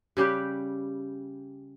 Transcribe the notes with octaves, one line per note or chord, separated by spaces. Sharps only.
C#3 G3 G4 B4